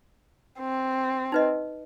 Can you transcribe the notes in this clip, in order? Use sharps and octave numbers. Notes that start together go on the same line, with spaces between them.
C4
D#4 B4 D#5